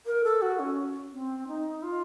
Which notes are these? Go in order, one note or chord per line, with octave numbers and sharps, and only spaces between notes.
A#4
A4
F#4
C#4
C4
D#4
F4